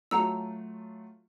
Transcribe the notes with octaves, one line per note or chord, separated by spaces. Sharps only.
F#3 A3 F4 F#5 A#5 E6